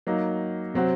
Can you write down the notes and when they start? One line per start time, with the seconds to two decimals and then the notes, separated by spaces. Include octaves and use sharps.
0.07 F#3 A#3 D#4
0.74 C3 F#3 C4 F#4